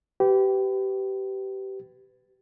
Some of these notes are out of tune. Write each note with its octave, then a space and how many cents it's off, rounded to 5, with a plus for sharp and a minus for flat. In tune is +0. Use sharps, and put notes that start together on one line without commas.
G4 -20 B4 +25